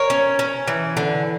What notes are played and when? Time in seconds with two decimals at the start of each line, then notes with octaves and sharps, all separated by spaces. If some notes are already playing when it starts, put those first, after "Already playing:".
Already playing: A#4 C#5
0.10 C#4
0.39 C#4
0.68 E3
0.97 D3